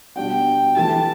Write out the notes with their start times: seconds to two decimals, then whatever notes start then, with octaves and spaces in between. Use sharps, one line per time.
0.16 B2 G3 D4 F#4 G5
0.76 E3 A3 E4 G4 A5